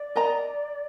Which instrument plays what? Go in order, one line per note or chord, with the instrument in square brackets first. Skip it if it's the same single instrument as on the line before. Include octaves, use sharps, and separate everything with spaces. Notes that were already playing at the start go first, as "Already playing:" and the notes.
Already playing: [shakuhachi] D5
[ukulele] A#4 D#5 A#5